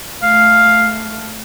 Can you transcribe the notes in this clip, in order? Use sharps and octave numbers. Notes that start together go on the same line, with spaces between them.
A3 F5